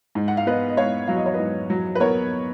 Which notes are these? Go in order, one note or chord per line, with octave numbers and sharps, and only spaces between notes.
G#2
F#5
F5
B3 B4 D#5
D#5
G#2 C#5 F5
F#3 F5
D#5
C#5
G#2 B4 D#5
F#3
B4
B3 A#4 C#5